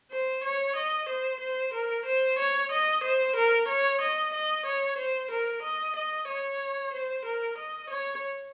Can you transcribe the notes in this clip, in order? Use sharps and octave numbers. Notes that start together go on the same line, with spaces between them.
C5
C#5
D#5
C5
C5
A#4
C5
C#5
D#5
C5
A#4
C#5
D#5
D#5
C#5
C5
A#4
D#5
D#5
C#5
C5
A#4
D#5
C#5